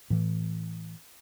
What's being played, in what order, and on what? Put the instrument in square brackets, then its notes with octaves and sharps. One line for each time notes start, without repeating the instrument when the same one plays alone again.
[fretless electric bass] A2 E3